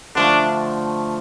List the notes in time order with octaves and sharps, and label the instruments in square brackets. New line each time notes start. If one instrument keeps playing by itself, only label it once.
[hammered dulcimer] D3 F3 A3 [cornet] D4